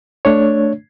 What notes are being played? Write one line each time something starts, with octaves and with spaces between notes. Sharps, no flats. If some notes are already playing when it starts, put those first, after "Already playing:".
A3 D4 C#5